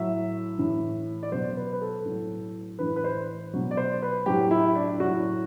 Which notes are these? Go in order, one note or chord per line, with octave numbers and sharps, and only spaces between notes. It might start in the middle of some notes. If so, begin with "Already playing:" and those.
Already playing: A2 F#3 E5
A2 E3
D5
B2 F#3 C5
B4
B4
A4
A2 F#3
A2 E3 B4
B4
C5
B2 F#3
D5
C5
B4
A2 F#3 G4
E4
D4
A2 F#3 F#4